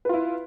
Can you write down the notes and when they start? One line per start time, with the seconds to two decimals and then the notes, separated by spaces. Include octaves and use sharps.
0.05 B4
0.09 F4
0.14 E4